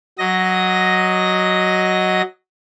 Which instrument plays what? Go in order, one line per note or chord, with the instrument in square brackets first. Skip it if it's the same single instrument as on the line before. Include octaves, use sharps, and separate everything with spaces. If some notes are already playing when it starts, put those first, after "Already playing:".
[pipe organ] F#3 D#5 A#6